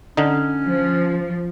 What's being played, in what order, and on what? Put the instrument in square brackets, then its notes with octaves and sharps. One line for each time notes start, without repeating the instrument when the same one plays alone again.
[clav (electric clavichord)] D3 D#4 [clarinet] C#4
[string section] F3